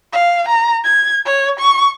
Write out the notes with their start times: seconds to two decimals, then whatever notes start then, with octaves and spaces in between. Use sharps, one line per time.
0.13 F5
0.49 A#5
0.84 G#6
1.26 C#5
1.59 C#6